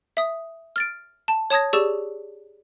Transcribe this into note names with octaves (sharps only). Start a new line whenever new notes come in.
E5 D#6
F6 A6 D7
A5
C#5 A5 D#6 G#6 A#6
G4 G#4 D5 C#6 E6 E7